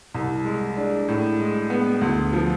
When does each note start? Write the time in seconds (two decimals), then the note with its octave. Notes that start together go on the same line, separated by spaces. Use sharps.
0.15 C2
0.45 G#3
0.77 D4
1.08 A2
1.40 G#3
1.70 B3
2.01 D2
2.33 F3